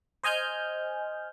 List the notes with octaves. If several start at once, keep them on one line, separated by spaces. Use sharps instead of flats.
C5 D#5 G#5 F6 G6